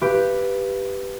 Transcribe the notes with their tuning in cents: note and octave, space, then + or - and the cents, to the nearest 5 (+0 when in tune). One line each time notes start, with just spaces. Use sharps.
G4 +0 B4 +0 F5 -35